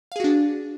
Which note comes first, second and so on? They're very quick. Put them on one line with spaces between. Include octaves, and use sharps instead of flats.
F5 G#4 F#4 D4